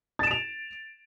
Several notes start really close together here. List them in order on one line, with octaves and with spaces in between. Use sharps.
A6 E7 D7 F7